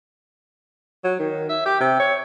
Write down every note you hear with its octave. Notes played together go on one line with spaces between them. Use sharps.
F#3
D#3
E5
G4
C3
C#5